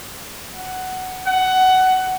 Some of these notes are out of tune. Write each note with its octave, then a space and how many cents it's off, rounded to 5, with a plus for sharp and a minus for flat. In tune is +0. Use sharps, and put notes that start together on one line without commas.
F#5 +10
F#5 +15